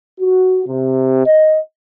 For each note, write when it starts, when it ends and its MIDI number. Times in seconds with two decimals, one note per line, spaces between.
0.20 0.63 66
0.67 1.25 48
1.25 1.59 75